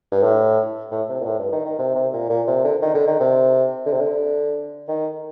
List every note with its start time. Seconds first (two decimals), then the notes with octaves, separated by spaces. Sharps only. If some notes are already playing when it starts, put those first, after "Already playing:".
0.12 G2
0.23 A2
0.91 A2
1.09 C3
1.21 A#2
1.25 A2
1.39 G2
1.52 D#3
1.65 D#3
1.78 C3
1.96 C3
2.13 A#2
2.29 A#2
2.47 C3
2.64 D3
2.81 D#3
2.95 D3
3.07 D#3
3.20 C3
3.85 D3
3.93 C3
4.01 D3
4.88 D#3